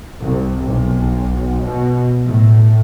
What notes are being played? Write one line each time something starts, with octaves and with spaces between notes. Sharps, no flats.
C2
B1
B2
A2